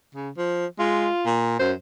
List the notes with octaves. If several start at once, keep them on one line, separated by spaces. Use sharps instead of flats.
C#3
F3
G#3 F4
A#2
F#2 C5